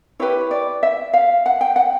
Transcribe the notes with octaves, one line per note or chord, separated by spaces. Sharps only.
E4 G4 B4 C#5
D5
E5
F5
F#5
G5
F#5